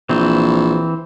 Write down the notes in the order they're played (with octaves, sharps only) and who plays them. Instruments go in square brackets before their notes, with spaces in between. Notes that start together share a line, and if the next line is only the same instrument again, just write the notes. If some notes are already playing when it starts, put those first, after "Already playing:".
[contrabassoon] A#1 [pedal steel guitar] E3 C4